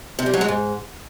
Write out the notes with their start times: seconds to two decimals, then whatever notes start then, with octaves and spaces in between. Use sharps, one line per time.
0.19 C3
0.26 G3
0.34 F#3
0.41 G#3
0.48 G#2